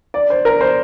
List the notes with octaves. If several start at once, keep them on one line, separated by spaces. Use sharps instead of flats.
D5
C5
A#4
C5